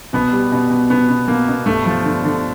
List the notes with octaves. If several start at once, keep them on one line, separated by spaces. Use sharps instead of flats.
B2 B3
G3
B2
B2
B2 B3
B2
B2 A#3
B2
G2 A3
F3
D3
D3